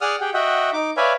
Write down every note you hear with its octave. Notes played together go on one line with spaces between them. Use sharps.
G#4 D5 F#5 D#6 F6
G4 G#4 F#5 G5
F#4 D#5 E5 F#5 G5
D#4 D6
B4 C#5 D5 E5 F5 G#5